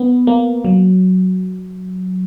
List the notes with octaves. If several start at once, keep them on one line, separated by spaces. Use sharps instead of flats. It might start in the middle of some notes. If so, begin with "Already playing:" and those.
Already playing: B3
A#3
F#3